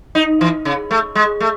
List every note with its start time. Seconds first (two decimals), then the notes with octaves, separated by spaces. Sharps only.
0.15 D#4
0.41 E3
0.65 C#3
0.91 A3
1.15 G#3
1.40 A3